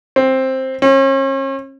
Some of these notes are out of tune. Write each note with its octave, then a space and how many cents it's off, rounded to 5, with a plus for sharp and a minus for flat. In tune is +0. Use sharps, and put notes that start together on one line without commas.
C4 +10
C#4 -40